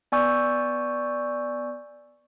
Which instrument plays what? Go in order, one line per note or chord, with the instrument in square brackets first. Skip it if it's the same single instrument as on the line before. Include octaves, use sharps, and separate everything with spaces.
[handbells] B3 D5 G#5 C#6 E6 G6